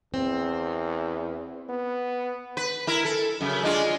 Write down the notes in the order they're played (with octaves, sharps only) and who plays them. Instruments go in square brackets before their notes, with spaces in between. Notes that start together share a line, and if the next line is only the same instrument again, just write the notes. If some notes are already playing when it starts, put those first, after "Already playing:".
[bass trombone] E2 [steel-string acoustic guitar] C4
[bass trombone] B3
[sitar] B4
E4 A#4
A4
F#2 C#3
G#3 D4 F4